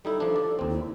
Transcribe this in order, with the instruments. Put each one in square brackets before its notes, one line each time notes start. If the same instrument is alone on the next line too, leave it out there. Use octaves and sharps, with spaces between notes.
[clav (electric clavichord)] G3 D#4 E4 [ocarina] A4
[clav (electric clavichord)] F3 D4
D5
D#2 C4
[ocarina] E4